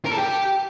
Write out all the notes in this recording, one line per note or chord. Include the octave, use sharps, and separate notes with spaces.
A#4
A4
G4